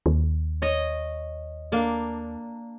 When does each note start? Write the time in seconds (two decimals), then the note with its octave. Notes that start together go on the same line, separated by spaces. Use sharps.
0.06 D#2
0.62 C#5 D#5
1.72 A#3 D4